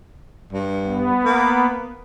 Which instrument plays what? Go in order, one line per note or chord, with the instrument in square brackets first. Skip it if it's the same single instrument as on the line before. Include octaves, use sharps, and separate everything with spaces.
[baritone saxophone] G2
[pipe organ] B3
[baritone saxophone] A#3